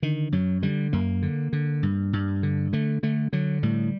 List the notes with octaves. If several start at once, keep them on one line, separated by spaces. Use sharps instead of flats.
D3 D#3
F#2 F#3
D3 G3
F#2 A#3
D3
D3
G2
G2
D3
D3 A3
D3 A3
D3 F#3
A2 G3